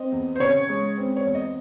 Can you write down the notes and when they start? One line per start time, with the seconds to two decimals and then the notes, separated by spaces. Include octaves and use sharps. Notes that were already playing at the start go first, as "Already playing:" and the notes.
Already playing: C4 D#5
0.12 E2
0.36 C5
0.40 C#3 C#5
0.69 G#3
0.98 C4
1.16 C#5
1.25 E2
1.35 D#5